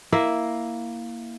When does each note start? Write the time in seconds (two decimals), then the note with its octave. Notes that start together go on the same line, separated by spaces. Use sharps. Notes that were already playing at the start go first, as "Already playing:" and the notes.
0.12 A#3 E4 E5